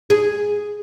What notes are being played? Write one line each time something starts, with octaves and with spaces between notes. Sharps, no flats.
G#4